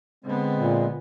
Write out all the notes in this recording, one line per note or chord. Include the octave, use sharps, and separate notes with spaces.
D3 G#3 B3 C4
A#2